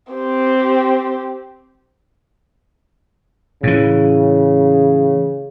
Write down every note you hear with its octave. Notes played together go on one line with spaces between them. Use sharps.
C4 G4
A2 C#3 E3